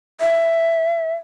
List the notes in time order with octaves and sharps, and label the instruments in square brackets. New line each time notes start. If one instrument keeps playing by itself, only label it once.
[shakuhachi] E5